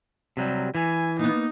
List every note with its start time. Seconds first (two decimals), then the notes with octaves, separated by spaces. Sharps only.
0.37 C3 F#3 G3
0.75 E3 G#5
1.19 A#3 B3 D#4